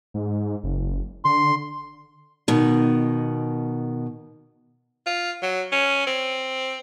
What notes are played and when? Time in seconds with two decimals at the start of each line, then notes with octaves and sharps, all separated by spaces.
0.14 G#2
0.64 F#1
1.25 D3 C6
2.48 B2 D#3
5.07 F4
5.42 F#3
5.72 C#4
6.07 C4